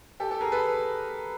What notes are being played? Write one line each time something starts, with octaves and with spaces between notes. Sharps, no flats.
G4 A4
G4 A4
G#4 A#4
A4 B4